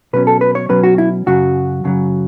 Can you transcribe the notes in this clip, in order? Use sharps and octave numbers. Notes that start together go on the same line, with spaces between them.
B2 F#3 C#4 B4
A4
B4
C#5
B2 F#3 C#4 B4
F#4
E4
F#2 C#3 F#3 F#4
F#2 C#3 F#3